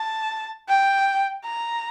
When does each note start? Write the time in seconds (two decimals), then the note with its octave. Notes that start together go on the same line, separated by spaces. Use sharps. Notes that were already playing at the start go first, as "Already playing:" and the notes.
Already playing: A5
0.69 G5
1.45 A#5